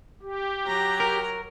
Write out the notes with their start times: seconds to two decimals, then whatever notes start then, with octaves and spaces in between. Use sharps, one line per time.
0.22 G4
0.66 F#3 A#5
1.00 A#4